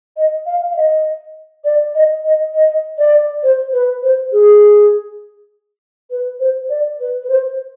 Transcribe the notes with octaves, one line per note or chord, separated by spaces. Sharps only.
D#5
F5
F5
D#5
D5
D#5
D#5
D#5
D5
C5
B4
C5
G#4
B4
C5
D5
B4
B4
C5